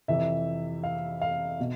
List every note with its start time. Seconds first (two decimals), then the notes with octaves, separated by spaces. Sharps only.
0.08 F2 C3 E3 E5
0.84 F5
1.21 F5
1.60 B2